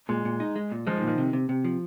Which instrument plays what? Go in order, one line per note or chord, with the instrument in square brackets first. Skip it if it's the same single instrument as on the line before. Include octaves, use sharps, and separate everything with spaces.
[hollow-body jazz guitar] A#2 [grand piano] G#3
[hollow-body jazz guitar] A#2
D#4
G#3
A#2
[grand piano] F3 [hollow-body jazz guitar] G#3
[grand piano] D#3
[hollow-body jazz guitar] A#2
[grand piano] D#3
[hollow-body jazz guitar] C3
C3
C3
F3